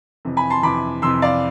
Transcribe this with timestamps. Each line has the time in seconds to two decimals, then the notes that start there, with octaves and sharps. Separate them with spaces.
0.25 F2 C3 E3
0.37 G#5 B5
0.50 A5 C6
0.63 F2 C3 E3 B5 D6
1.02 F2 C3 E3 C6 E6
1.22 D5 F5